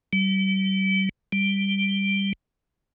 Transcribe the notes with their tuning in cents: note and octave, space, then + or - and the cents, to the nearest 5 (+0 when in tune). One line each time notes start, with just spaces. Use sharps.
G3 -35
G3 +5